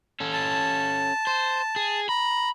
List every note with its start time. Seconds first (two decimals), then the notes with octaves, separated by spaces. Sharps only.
0.20 C#4 A4
0.33 A5
1.27 C5
1.76 G#4
2.09 A#5 B5